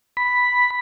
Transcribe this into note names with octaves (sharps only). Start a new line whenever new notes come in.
B5